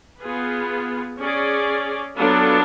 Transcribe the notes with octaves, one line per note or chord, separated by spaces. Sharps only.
B3 F4 G#4 B4
C#4 G#4 D5
F#3 B3 D4 F4 A4